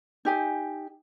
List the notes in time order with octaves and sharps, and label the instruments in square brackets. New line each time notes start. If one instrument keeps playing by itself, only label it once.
[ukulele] D#4 G4 G#5